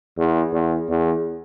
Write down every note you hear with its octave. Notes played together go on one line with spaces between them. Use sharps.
E2
E2
E2